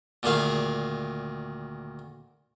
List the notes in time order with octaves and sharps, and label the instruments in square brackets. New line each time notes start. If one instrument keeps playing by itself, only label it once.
[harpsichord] D2 A#2 D#3 G#4 F5